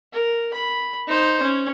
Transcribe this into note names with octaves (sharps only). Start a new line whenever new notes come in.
A#4
B5
D#4 C5
C#4